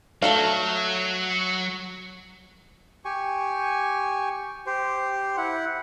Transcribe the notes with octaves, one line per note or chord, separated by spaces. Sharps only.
F#3 A3 A4 F5
G4 G#5 C#6
G4 C5
E4 F#5